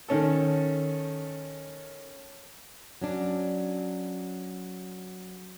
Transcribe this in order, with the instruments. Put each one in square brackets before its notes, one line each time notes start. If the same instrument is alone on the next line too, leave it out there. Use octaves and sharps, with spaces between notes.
[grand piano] D#3 C#4 A4
[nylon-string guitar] F#3 C#4 D4